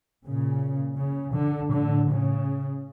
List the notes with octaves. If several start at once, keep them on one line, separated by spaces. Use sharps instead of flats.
A#2 C#3
C#3
D3
A2 D3
C#3